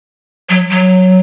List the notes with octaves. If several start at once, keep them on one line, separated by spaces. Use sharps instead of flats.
F#3
F#3